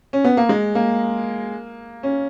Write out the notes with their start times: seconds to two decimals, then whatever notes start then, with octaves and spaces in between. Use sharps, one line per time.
0.13 C#4
0.24 B3
0.37 A#3
0.49 G#3
0.75 A#3
2.03 C#4